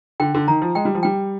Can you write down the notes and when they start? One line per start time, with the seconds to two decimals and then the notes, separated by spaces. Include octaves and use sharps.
0.20 D3 G5
0.35 D3
0.48 D#3 A#5
0.62 F3
0.75 G#3 G5
0.85 G3
0.95 F3
1.03 G3 G5